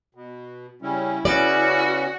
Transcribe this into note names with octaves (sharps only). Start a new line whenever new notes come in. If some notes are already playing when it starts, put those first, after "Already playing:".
B2
C#3 G3 C#4 E4
C#3 B3 C#4 F#4 D5